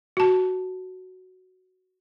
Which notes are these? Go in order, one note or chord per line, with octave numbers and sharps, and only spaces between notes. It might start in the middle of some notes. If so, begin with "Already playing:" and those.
F#4 A5